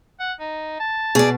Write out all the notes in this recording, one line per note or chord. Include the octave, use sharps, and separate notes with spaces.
F#5
D#4
A5
B2 G#4 D5